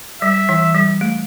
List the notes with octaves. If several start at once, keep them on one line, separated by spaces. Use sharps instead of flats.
G3 E5
E3
G3
A3